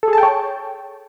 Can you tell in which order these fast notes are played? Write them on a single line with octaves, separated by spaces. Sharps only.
A4 G#4 A5 G5 C#5